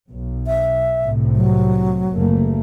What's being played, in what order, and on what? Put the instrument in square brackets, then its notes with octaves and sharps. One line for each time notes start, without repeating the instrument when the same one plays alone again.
[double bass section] B1
[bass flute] E5
[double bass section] C2 A2 C3
[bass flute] F#3
[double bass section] F#1 A3 A#3